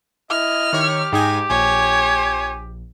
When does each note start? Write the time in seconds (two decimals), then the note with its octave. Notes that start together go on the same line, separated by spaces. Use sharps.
0.31 E4 D#5 F6
0.73 D#3 G4 C#5
1.13 G#2 D#4 G5 G#5
1.50 A#1 C#5 G#5